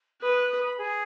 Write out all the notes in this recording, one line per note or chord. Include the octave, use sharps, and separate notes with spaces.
B4 D#6
F#6
D#6
B5
G#4